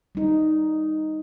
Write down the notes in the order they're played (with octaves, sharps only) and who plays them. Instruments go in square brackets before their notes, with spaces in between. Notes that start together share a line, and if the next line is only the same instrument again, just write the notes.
[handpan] G3 D#4